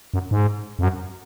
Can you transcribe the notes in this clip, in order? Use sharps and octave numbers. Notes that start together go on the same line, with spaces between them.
F#2
G#2
F2
F#2